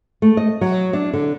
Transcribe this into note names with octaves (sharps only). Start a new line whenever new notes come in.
A3
D#5
F#3
D4
D3